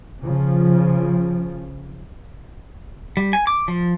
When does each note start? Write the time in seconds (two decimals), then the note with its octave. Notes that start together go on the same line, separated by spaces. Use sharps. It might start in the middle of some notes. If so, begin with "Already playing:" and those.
0.23 C#3 F3
3.17 G3
3.33 G#5
3.47 D6
3.68 F3